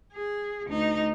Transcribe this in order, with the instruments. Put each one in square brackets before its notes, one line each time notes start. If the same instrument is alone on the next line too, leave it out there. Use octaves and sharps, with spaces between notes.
[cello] G#4
D2 D#4